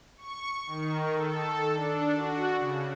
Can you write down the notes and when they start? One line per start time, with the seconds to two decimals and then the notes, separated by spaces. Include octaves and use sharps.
0.17 C#6
0.67 D#3
1.12 A4
1.73 D4
2.16 F#4
2.58 C#3